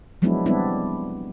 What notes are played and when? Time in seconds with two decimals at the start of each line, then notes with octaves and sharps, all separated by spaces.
0.22 F3 F#3 G#3 B3 D4 E4
0.46 G3 B3 C4 D4 E4